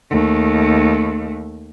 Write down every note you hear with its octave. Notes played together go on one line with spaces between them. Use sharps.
D#2 A3